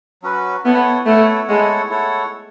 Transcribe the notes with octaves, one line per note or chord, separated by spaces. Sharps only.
F#3 C#4 F#4 B4
B3 E4 A4 C#5 F#5
A3 E4 A4 C#5 F#5
G#3 E4 A4 C#5 F#5
E4 A4 C#5 F#5